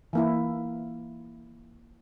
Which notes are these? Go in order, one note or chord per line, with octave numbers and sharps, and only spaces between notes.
E3 A#3 E4